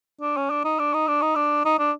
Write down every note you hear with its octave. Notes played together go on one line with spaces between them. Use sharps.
D4
C#4
D4
D#4
D4
D#4
D4
D#4
D4
D#4
D4